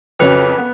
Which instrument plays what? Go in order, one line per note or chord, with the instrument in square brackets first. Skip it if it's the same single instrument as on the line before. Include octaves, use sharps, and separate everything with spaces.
[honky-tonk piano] F2 C#3 F#3 C#4 [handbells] B4
[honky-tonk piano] B3